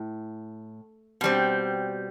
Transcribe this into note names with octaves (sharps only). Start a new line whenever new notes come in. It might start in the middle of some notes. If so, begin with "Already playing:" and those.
Already playing: A2
B2 G3 C4